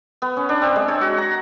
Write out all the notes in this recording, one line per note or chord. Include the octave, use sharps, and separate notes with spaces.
B3
C#4
D4
C4
G#3
C#5
F#4
A#5